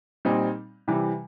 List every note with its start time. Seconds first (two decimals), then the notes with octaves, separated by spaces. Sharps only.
0.25 A#2 G3 C4 D#4
0.88 C3 E3 G3